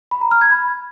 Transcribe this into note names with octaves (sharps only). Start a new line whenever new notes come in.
B5
A#5
F6
G#6
B5